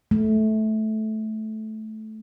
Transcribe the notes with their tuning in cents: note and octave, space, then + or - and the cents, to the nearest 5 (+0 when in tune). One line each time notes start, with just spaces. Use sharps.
A3 -15